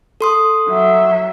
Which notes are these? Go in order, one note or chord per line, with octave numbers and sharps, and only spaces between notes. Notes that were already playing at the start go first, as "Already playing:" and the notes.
A4 C6 D#6
F#3 E5